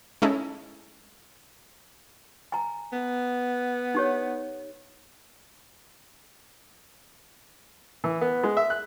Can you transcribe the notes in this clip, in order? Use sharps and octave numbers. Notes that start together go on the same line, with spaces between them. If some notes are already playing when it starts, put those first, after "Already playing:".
G#3 C#4 D#4 E4 A4
G#5 A#5
B3
D#4 G4 C#5
E3
B3
G#3
E5
F#6